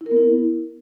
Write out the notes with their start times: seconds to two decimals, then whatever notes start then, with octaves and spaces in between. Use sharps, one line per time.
0.01 E4
0.06 A#4
0.11 B3
0.16 E4